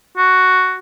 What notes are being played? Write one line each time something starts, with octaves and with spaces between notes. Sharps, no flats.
F#4